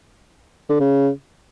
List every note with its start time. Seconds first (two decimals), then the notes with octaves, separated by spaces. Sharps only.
0.69 D3
0.80 C#3